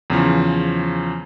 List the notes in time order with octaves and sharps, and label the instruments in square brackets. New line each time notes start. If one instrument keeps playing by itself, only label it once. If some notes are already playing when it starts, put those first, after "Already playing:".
[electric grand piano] E2 C#3 F3